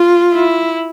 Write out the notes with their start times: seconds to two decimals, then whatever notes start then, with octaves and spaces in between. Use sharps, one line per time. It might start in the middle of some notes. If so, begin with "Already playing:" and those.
Already playing: F4
0.33 E4